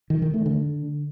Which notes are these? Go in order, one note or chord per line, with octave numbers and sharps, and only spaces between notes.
D#3
D#3
A3
D3